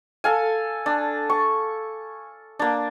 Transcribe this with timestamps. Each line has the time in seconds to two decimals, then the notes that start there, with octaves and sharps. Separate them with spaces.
0.24 A4 F5 G#5
0.86 D4
1.29 C#6
2.59 A#3 D4